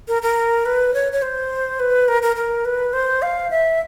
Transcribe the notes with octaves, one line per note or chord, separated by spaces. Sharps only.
A#4
A#4
B4
C#5
C#5
C5
B4
A#4
A#4
A#4
B4
C5
F5
E5